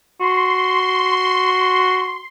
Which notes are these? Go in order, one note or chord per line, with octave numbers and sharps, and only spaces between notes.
F#4 C6